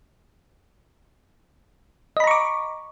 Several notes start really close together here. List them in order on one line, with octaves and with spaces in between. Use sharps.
D#5 B5 A#5 C#6 D6